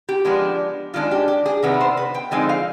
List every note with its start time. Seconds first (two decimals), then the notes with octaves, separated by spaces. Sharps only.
0.09 G4
0.25 F3 G#3 B3 D4
0.94 D#3 G#3 D4 F4
1.11 G4
1.28 G4
1.46 G#4
1.63 C3 D#3 B3 D4 B4
1.80 C5
1.97 B4
2.14 G5
2.31 D3 F3 G#3 C4 D#4 G#5
2.49 F5